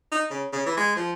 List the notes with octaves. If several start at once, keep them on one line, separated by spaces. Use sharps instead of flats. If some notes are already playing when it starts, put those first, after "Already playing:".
D#4
C#3
C#3
E3
G#3
F3